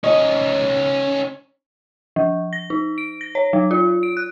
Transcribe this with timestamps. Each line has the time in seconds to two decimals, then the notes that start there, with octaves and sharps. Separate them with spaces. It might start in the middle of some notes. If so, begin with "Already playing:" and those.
0.04 C#4 D#4 D#5
2.16 F3
2.53 A#6
2.70 D#4
2.98 D7
3.21 A#6
3.35 C#5
3.53 F#3
3.71 F4
4.03 D7
4.17 F#6